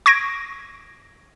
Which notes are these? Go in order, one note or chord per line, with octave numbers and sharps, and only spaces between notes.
C#6 G#6 A#6 D7